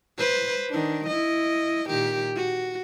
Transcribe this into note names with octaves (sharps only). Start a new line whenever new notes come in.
B4 C5
D#3 D4
E4 D#5
A#2 D#3 G4
F#4